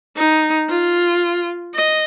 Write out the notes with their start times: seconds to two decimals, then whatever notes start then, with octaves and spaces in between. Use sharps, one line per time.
0.17 D#4
0.69 F4
1.74 D#5